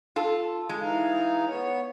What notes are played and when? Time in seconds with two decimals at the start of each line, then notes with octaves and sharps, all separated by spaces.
0.16 F4 A4
0.69 G#3
0.82 E3 D#4 F5
1.49 B3 C#5